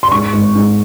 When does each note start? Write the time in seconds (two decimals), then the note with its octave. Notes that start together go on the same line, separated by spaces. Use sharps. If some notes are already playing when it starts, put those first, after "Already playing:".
0.03 C6
0.11 G#2 C#6
0.33 G#1
0.55 G#2